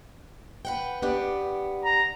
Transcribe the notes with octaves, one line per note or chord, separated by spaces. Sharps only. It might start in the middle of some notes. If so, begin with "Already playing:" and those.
B4 F#5 G5
B3 D4 G4
A#5